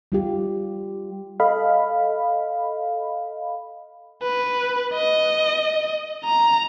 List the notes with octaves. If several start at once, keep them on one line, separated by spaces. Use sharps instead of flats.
G3 F4 G4
A4 D#5 F5 B5
B4
D#5
A#5